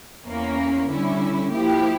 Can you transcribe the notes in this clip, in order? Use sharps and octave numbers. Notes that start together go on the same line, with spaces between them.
E2 E3 A#3 C#4
D3 G3 C#4 E4
F3 A#3 E4 G4